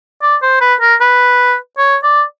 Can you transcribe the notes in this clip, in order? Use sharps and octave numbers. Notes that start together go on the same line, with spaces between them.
D5
C5
B4
A#4
B4
C#5
D5